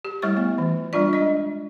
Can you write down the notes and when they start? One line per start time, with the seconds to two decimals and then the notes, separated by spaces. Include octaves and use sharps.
0.05 G4
0.22 G3 A3 E4 C#5 C#6
0.37 B3
0.58 E3
0.93 G3 D4 F4 D5
1.13 G#3 D4 D#5